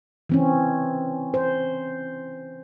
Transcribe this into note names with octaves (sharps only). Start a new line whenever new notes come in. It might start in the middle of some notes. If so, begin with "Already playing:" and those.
E3 C4 C#4
C5